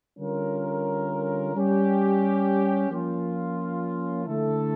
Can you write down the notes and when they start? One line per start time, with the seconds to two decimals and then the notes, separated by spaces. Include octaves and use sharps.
0.18 D3 G3 C#4 F4 A#4
1.54 G3 C#4 G4
2.90 F3 A#3 C#4 F4
4.25 D3 A3 E4 A4